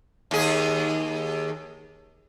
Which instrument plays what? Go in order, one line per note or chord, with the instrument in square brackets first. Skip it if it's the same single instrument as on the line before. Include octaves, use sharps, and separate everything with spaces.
[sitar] D#2 G#4